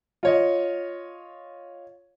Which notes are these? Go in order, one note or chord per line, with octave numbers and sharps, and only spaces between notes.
F4 C#5 D#5